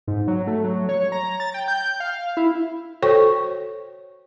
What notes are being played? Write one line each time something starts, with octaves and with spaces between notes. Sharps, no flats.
G#2
F#3
A3
F#3
C#5
A#5
A6
G5
G6
F5
E4
F#4 A4 C5 C#5 G5 C#6